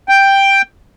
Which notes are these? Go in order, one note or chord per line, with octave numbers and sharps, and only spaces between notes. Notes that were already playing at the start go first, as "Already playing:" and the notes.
G5